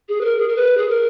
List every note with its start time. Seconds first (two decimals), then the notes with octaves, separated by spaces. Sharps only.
0.09 G#4
0.21 B4
0.25 A#4
0.39 G#4
0.48 A#4
0.56 B4
0.77 G#4
0.89 A#4